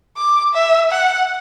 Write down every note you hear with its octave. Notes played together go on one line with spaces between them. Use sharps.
D6
E5
F#5